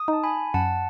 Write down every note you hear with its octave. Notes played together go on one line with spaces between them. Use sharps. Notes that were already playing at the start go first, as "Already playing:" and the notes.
Already playing: D#6
D#4 A5
G#5 B5
F#2 F#5 A5